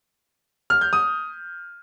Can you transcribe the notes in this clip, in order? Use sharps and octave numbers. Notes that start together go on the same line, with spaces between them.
F6
G6
D#6